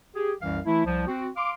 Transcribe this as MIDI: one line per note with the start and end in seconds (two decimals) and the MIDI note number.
0.16 0.32 67
0.16 0.32 68
0.41 0.60 36
0.41 0.60 42
0.41 0.60 52
0.41 0.60 77
0.65 0.85 52
0.65 0.85 57
0.65 0.85 64
0.86 1.03 36
0.86 1.03 53
1.07 1.28 60
1.07 1.28 66
1.37 1.52 77
1.37 1.52 84
1.37 1.52 86